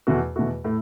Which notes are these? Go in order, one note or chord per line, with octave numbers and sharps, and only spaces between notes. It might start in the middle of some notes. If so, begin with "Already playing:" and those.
E2 B2 A3 F#4
E2 B2 A3 F#4
A2 A3 E4